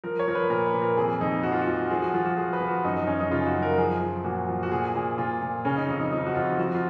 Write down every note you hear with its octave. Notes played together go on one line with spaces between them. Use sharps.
F3 A#4
C#5
F3 A#4
B4
A#2 A#4
B4
A#2
A#4
F2 G#4
F2 D#4
F2 F#4
F4
F#4
F3
F3 G#4
F#4
F3 F4
F#4
F3 G#4
B4
F3
F#4
F#2 D#4
D#4
F#2 C#4
D#4
C#3 F4
G#4
F#4
F#2
A#4
F3 G#4
F3
A#2 F#4
F3
F#4
A#2 G#4
A#2 G#4
A#2 F4
A#2
C#3 C#4
D#4
F2 D#4
D#4
F3 D#4
F#4
F2 F4
F3 F#4
F4